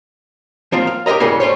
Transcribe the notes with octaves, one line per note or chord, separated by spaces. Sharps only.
F3 A#3 C4 F4
F5
G4 A#4 B4 D#5 A#5
G#2 C#3 E3 F#3 G3
G3 A3 C5 C#5